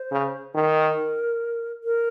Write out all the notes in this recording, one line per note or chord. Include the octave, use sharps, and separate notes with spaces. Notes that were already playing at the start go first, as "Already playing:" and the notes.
Already playing: C5
C#3
D#3 A#4
A#4